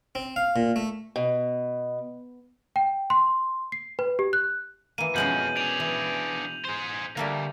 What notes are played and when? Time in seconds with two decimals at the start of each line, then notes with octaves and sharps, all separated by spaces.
0.15 C4
0.36 F5
0.56 A#2
0.76 A3
1.16 B2
2.76 G5
3.10 C6
3.72 C7
3.99 B4
4.19 G4
4.33 F#6
4.98 E3 A#3 D#7
5.16 F2 B2 F3 G#3 C#4 G6 F#7
5.57 D4 G#4 F7
5.80 E3
6.65 G#4 C5
7.17 D2 G3 A3 A#3